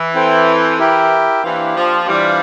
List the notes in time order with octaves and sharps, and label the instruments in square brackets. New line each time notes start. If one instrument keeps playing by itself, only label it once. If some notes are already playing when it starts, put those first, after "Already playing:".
Already playing: [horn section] E3
[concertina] C4 E4 A4 C5 G5
E4 G4 A#4 E5 G5
[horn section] E3 [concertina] A#3 D4 G4 C5 F5
[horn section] F3
[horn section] E3 G3 [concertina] D4 F4 C5 F5